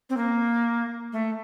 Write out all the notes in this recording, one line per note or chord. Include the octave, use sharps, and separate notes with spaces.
C4
A#3
A3